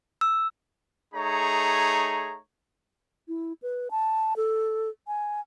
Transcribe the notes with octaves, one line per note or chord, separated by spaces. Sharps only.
E6
A3 D#4 G#4 C#5 A#5
E4
B4
A5
A4
G#5